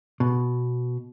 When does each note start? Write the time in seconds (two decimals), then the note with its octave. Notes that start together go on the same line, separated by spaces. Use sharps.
0.20 B2